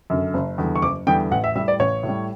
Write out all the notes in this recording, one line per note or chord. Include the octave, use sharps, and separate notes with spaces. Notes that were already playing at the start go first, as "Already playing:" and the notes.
F#2 D3
F#1
E2 D3 G3
C#6
F#1 D6
E2 D3 G3 G5
A1 F#5
E5
A2 G3 E5
D5
A1 C#5
A2
G3